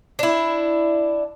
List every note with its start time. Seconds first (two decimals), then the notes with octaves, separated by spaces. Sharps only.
0.19 D4 E4